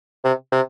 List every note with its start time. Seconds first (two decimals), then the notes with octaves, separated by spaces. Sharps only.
0.24 C3
0.52 C3